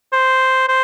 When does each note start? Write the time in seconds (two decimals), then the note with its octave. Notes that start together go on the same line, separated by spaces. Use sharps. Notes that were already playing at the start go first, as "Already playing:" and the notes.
0.13 C5
0.69 C5